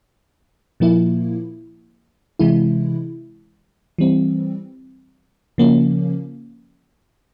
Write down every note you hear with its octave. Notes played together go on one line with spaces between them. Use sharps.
A#2 F3 A#3 E4
C3 E3 G#3 E4
E3 G3 C4
C#3 F3 A#3 C#4